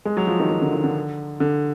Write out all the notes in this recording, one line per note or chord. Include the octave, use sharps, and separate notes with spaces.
G#3
F#3
F3
D#3
D#3
D3
D#3
D3
D3